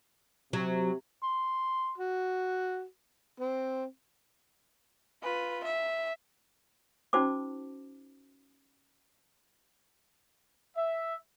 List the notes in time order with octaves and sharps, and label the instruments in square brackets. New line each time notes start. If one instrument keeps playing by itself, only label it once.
[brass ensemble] C3 [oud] F#3
[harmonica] C6
F#4
C4
[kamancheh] F4 B4
E5
[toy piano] C#4 D#4 F#4 C5 A5 D6
[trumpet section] E5